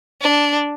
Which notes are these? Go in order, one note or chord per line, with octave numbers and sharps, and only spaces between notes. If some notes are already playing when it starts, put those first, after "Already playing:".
D4